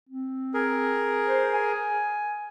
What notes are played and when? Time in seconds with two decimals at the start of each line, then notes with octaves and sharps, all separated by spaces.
0.09 C4
0.54 G#4 A#4
1.27 C5
1.53 G#5